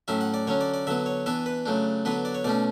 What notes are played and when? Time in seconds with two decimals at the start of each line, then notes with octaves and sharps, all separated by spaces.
0.08 A2 F#3 C#4 E5
0.21 F#5
0.34 D5
0.47 D3 F#3 C#4 C#5
0.61 D5
0.74 D5
0.87 D3 F#3 B3 E5
1.06 C#5
1.26 E3 B3 D4 E5
1.46 B4
1.66 C#3 F#3 A3 D4
2.05 D3 F#3 B3 D4 B4
2.25 D5
2.35 C#5
2.44 B2 A3 C#4 D5